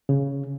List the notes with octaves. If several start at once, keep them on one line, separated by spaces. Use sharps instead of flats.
C#3